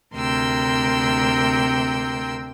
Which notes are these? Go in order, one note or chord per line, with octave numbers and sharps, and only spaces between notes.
D2 C3 A#4 G5 C6 E6